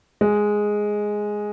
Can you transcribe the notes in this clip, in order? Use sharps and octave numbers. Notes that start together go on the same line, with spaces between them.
G#3